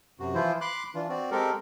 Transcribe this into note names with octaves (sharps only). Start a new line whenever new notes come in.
F#2 C3 F#4
E3 F3 E4 F4 C5
B5 C6 D6 F#6
E3 D4 F4
C4 F#4 D5
G#3 C4 G4 A4 A#4